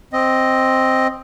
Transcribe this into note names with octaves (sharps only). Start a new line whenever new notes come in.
C4 D#5